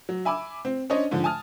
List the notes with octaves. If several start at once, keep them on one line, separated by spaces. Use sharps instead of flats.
F#3
E5 G#5 B5 D6 E6
C4
C#4 D4 C5 C#5 D#5
G#2 D3 F3
G#5 A5 D#6 F6